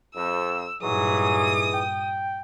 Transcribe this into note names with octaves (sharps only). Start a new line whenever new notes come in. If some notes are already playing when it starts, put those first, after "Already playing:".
F2 E6
G2 A#2 E3 F#3 D#4 G#4 D#6
G5